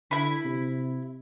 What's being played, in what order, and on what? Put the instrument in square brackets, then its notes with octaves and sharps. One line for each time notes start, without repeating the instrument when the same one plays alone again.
[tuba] D3 [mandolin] E4 B5
[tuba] C3